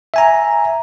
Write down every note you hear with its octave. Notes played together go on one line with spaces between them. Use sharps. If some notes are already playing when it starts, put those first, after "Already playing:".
E5 G#5 A#5